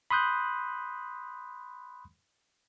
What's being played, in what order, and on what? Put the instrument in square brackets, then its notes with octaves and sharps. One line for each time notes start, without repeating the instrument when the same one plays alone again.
[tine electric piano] B5 C6 D#6 F#6 G6